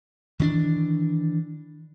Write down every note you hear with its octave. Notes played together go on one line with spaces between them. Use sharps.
D#3 E3 C#4 D4